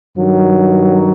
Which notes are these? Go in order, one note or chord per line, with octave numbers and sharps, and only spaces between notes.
G2 D#3 F#3